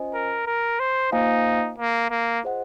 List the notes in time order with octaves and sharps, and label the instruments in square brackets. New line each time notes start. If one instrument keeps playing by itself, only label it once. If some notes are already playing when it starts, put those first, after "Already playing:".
Already playing: [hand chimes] C#4 F4 C5 D#5 G#5
[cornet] A#4
A#4
C5
[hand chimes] A#3 F4 C5 F5 G#5 [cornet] D#4
[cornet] A#3
A#3
[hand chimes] F4 G#4 C5 D#5 F#5